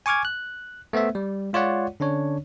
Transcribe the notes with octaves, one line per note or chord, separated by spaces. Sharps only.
G#5 C#6 D6 F6 G#6
F#6
A3 B3 C5 E5
G3
G#3 F4 C#5 D5 F#5
D3 C#4 D4 C#5